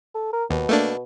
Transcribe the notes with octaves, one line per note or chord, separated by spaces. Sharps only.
A4
A#4
D#2 B2
A3 A#3 D4